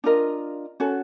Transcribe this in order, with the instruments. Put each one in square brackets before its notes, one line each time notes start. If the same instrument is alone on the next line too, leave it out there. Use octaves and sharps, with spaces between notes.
[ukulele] D4 F4 A#4 D#5
C#4 F#4 A4